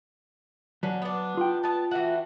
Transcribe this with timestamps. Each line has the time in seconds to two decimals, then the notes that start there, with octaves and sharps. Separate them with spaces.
0.83 D3 F#3 C#4
1.02 B3 D4
1.37 F4 G5
1.63 B3 A5
1.91 E3 A3 F#4